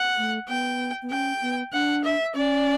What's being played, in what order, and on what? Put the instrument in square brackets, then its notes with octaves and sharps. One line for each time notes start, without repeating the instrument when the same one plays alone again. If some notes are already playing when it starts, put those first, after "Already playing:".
Already playing: [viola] F#5
[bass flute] A3
[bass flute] B3 [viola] G5
[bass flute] B3
[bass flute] C#4 [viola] G5
[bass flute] B3
[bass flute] D4 [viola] F#5
[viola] E5
[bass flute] C#4 [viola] D5